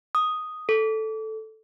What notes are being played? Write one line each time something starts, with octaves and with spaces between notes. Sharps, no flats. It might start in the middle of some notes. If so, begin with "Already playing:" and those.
D#6
A4